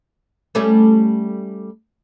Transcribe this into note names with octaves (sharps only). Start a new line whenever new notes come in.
G3 A3 C#4